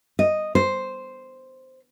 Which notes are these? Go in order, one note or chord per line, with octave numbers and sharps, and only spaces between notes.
D#5
C5